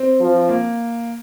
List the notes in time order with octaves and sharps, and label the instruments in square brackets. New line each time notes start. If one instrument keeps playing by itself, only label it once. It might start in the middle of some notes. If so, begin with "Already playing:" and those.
Already playing: [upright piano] C4
[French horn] F3
[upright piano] A#3